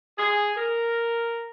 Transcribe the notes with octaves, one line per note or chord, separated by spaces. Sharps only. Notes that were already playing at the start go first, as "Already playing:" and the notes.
G#4
A#4